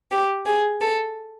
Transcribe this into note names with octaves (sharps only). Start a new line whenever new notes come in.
G4
G#4
A4